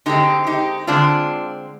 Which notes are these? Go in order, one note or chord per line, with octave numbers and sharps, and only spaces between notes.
D3 G#3 C4 D#4 G4
D#4 G4
D3 G#3 C4 D4 F4